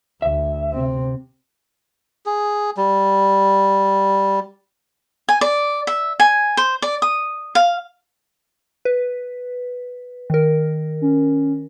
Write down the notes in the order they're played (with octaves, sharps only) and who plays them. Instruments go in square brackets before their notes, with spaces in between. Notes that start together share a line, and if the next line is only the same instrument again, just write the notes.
[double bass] D2 [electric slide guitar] E5
[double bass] C3 C4
[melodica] G#4
G3
[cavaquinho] G#5
D5
E5
G#5
C5
D5
D#6
F5
[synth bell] B4
D#3 A#4
[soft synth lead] C#4